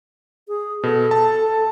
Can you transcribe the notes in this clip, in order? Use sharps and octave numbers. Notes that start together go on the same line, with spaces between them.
G#4
B2 A4
A5